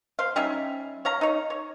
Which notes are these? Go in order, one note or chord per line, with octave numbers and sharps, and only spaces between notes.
C5 F5
G3 C#4 D#4 E5
C#5 F5 A#5
D#4 C#5
C#5